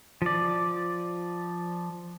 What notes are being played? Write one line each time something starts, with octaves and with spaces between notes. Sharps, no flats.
F3 D5